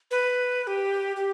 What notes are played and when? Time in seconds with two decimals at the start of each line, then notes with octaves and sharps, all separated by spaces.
0.11 B4
0.64 B4
0.67 G4
1.16 G4